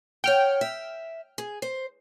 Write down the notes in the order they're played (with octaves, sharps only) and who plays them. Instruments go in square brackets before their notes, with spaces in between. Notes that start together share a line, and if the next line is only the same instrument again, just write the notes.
[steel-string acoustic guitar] C#5 F#5 [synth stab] G5 F6
[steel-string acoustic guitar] E5
G#4
C5